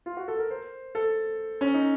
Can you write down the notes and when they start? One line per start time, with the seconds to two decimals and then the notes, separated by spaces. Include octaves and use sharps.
0.06 F4
0.17 F#4
0.28 A4
0.39 A#4
0.50 C5
0.95 A4
1.61 C#4
1.74 D#4